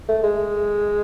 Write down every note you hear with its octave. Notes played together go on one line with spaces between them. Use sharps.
A3
G#3